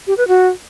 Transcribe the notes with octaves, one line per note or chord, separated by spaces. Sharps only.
G4
B4
F#4